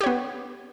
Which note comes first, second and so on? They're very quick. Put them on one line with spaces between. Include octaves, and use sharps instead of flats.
G4 C#5 B3